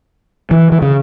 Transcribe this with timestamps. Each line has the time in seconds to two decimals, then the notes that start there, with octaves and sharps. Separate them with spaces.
0.51 E3
0.72 E3
0.82 C#3